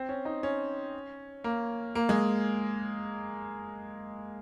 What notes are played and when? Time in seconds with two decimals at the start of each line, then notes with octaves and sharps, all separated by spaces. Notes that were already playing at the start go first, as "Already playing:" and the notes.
Already playing: C4
0.09 C#4
0.25 D#4
0.43 C#4
1.44 A#3
1.95 A#3
2.09 G#3